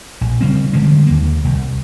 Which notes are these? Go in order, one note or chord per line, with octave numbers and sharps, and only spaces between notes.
A#1
C#3 G3 C4
D3 F3 G3 G#3
D#2 A#3
C2